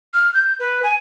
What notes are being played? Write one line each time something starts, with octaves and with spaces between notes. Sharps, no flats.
F6
G6
B4
G#5